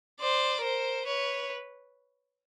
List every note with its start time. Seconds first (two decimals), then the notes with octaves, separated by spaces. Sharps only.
0.20 C5 D5
0.63 A#4 C5
1.06 B4 C#5